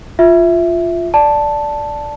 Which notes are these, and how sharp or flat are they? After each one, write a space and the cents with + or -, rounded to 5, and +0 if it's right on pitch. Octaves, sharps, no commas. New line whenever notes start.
F4 +0 E5 +0
D5 +0 A5 +0